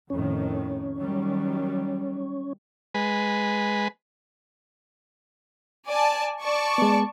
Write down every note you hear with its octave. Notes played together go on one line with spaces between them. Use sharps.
F2 A2 D#3 C#4
D#3 F#3 G3
G#3 B4
D5 G#5 A5
D5 A5 C#6
G#3 B3